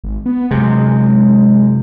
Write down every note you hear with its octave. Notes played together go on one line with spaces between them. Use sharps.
G#1
B3
F#2 C3 G#3